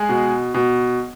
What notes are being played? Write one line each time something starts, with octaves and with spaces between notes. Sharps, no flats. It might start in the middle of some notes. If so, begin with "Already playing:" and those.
Already playing: G#3 G#4
B2
B2